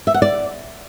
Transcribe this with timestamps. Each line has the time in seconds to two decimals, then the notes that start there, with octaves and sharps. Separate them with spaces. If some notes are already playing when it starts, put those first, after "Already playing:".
0.07 E5
0.14 F#5
0.22 D5